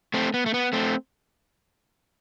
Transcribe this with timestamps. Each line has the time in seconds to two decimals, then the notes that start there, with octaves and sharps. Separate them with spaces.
0.14 A3 C4
0.34 B3
0.46 A3
0.54 B3
0.73 A3 C4